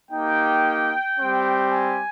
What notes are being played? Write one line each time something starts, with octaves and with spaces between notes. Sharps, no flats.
A#3 D#4 G4 G5
G3 C4 G4
G#5